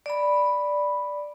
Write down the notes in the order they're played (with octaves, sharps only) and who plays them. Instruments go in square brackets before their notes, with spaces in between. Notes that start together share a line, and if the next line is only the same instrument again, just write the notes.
[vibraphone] D5 B5